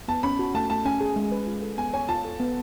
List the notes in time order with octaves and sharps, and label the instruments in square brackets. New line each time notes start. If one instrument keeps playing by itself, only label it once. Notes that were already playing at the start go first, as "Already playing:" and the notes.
[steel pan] B3 [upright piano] A5
[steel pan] C#4 [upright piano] B5
[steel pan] F#4
[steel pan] A3 [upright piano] A5
[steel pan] A3 [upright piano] A5
[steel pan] C#4 [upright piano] G#5
[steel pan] G#4
G#3
B4
F4
A4
[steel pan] B3 [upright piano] G#5
[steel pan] C#5 [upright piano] G#5
[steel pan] F4 [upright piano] A5
[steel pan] A4
B3